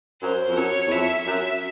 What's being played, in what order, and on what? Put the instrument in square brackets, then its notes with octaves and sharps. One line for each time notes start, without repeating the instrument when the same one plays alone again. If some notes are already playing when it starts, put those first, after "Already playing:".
[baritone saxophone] F#2 [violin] C5
[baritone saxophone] F2
[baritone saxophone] F#2 [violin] C#5
[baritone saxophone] E2
[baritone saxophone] F2 [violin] E5
[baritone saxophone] F#2